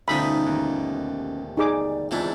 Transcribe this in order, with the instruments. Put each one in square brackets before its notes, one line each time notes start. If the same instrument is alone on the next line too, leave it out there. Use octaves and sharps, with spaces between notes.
[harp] G1 D#4 D#6 [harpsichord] D2 B2 F3 [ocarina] C#4 [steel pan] B5
[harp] D#2
[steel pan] D#4 G#4 D6 [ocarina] D5
[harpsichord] E2 G#2 D4 [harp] C4 E4 [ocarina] F4